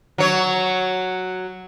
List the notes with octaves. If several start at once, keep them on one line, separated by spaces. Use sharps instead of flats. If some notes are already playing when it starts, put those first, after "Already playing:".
F#3 C#5